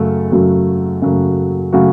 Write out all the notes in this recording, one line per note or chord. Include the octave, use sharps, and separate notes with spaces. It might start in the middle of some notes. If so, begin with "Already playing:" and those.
Already playing: F#2 C#3 F#3 A3
F#2 C#3 F#3 A3 F#4
F#2 C#3 F#3 A3 F#4
C#3 F#3 A3 F#4